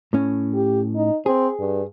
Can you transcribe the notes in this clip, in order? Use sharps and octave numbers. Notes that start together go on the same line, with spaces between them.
A2 C#4
G4
D#4
C4 G#4
G2